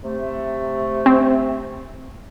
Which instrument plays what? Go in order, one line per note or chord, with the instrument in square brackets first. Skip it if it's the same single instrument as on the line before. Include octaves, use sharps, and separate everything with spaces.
[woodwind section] C3 A3
[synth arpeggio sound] C4